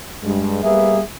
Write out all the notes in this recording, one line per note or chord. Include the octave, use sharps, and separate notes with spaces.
G2 G#3
G3 A#3 B3 G#4 B4 E5